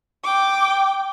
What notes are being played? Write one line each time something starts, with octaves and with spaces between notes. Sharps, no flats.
G5 D6